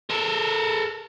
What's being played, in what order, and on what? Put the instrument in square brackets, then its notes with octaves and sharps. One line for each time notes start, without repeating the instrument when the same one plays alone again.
[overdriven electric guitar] A4 A#4